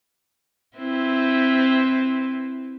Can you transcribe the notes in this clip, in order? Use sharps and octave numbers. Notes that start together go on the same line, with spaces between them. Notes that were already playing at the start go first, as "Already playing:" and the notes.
C4 E4 B4